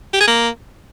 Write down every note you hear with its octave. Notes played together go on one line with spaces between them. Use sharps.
G4
G#4
A#3